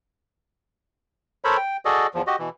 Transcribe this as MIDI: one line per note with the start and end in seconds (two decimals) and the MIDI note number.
1.45 1.57 69
1.45 1.57 70
1.45 1.57 72
1.45 1.57 73
1.45 1.57 83
1.57 1.77 79
1.85 2.07 66
1.85 2.07 68
1.85 2.07 69
1.85 2.07 74
1.85 2.07 75
2.14 2.22 40
2.14 2.22 53
2.27 2.36 66
2.27 2.36 67
2.27 2.36 75
2.39 2.49 47
2.39 2.49 52